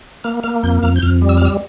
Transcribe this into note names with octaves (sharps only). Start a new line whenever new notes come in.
A#3 F6
A#3 F6
F2 G6
F2 F6
G6
F2 F6
G3
E6
F6
G3 E6